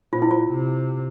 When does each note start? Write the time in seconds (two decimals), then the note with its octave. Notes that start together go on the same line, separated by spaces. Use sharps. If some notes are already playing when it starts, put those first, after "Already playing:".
0.13 A#2 F4
0.22 E4
0.31 F4
0.50 C3